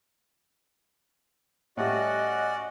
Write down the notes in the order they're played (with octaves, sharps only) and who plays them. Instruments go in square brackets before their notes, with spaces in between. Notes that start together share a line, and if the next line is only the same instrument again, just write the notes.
[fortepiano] A2 G3 [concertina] C#4 F#5 [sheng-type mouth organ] F#4 D5 [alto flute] D#5